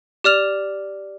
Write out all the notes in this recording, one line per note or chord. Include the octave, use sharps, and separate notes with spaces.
G4 D5 F6 F7